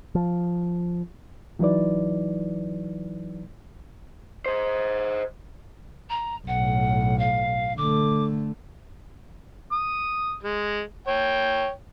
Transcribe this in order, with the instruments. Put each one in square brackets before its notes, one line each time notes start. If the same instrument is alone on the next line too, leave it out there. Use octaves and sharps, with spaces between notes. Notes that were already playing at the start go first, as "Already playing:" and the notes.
[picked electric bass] F3
[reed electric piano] E3 F#3 D#4 E4 B4 D5
[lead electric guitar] G#4 C5
[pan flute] A#5
[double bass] B1 A2 [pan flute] F#5
[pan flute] F5
[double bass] D3 A3 [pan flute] D6
[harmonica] D#6
G#3
C#5 G5